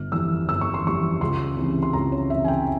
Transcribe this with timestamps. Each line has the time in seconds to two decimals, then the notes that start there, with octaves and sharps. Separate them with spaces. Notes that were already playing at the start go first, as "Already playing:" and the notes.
Already playing: G1 F6
0.12 F2 E3 G3 E6
0.48 G1 E6
0.61 C#6
0.74 C6
0.84 F2 E3 G3 C#6
1.21 C#2 C6
1.57 C3 E3
1.83 C6
1.93 C#2 A#5
2.12 C#5
2.30 C3 E3 E5
2.44 G#5
2.48 G5